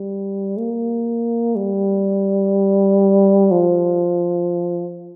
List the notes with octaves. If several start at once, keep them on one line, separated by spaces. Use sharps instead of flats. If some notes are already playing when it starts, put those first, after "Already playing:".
Already playing: G3
A#3
G3
F3